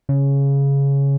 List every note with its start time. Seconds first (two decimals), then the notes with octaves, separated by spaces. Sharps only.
0.09 C#3